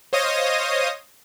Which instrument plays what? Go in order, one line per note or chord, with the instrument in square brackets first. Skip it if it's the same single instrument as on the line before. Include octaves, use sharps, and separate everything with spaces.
[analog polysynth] C5 C#5 D#5 F5 D#6 A#6